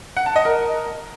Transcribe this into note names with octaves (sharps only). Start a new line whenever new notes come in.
F#5
A5
D#5
A#4